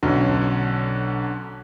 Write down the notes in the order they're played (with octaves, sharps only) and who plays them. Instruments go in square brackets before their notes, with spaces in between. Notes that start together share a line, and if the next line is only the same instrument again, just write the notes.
[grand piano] B1 [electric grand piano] D3 C#4